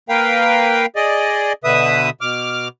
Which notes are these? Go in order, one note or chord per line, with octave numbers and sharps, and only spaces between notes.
A#3 A#4 B4 F5 G5
G#4 D5 D#5
B2 D3 B4 E5 D#6
B2 D6 F6